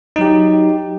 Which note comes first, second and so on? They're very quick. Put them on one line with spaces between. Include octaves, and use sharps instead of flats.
D#4 F#3 G4